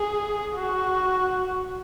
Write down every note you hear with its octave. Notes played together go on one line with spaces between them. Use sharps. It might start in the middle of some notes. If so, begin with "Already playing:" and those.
Already playing: G#4
F#4